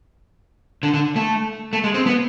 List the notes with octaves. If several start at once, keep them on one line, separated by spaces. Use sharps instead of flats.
D3
D3
A3
A3
G#3
C4
B3